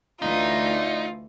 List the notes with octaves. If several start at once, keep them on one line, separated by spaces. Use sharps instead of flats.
D2 E3 A3 D#4 F4 D5 E5